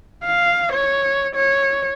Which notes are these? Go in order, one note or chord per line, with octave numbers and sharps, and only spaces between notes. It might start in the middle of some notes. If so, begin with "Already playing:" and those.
F5
C#5
C#5